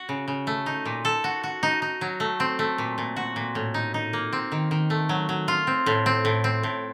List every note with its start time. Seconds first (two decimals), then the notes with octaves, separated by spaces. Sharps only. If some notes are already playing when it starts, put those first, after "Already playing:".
Already playing: F#4
0.09 C#3
0.28 C#3
0.47 A3
0.66 D#4
0.86 A#2
1.05 A4
1.24 F#4
1.44 F#4
1.63 D#4
1.82 D#4
2.01 F#3
2.20 A3
2.40 C4
2.59 A3
2.78 A#2
2.98 A#2
3.16 F#4
3.36 A#2
3.55 A2
3.74 D#4
3.94 D#4
4.13 A#3
4.33 C4
4.52 D#3
4.71 D#3
4.90 A3
5.09 F#3
5.29 F#3
5.48 F4
5.67 C4
5.86 A2
6.06 C4
6.25 A2
6.44 C4
6.63 A2